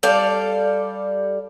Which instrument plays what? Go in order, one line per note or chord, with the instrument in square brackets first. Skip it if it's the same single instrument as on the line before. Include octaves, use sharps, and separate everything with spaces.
[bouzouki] G3 A4 D5 F5